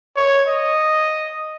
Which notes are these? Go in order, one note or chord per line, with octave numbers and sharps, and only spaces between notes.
C#5
D#5